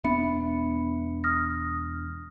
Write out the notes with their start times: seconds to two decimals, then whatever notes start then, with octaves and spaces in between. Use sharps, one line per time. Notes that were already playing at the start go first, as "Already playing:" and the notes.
0.04 E1 B3 D4 E5 B5 C#7
1.24 D#6 F6 A#6